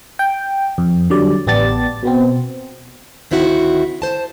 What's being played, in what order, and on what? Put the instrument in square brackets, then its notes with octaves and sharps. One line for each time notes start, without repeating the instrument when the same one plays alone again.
[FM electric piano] G5
F2
D3 F#3 G3 D5
A1 B3 G4 D5 A5 A6
B2 B3 C4
[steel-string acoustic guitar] D2 D#3 C4 E4 F#4
C5 A5